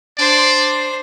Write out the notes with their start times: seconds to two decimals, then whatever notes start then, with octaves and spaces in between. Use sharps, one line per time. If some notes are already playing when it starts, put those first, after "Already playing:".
0.18 D4 C5 D5